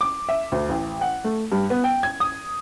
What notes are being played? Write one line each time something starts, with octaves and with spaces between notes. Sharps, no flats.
D6
E5
D2
A1
F#5
A3
G2
B3
G5
G#6
D#6